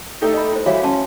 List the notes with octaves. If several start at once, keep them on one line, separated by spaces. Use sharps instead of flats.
A3 D#4 G4 A4
D#5 B5
E4 C5
E3 G3 F#4 C#5 E5 F5
C#4 G5 A5 C6